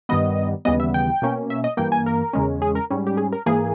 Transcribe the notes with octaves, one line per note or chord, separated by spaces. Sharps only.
G2 D#3 G3 B3 D#5
D#2 C#3 E3 G3 B3 D#5
E5
G5
B2 A#3 C#4
E5
D#5
G2 E3 A#3 G5
G#5
A#4
E2 C#3 G#3 C#4
G#4
A#4
G#2 G3 C#4
G4
G#4
A#4
G#2 E3 A#3 G#4